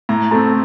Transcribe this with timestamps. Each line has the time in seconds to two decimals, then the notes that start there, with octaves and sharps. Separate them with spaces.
0.09 A2 A#5
0.31 A3 C4 A5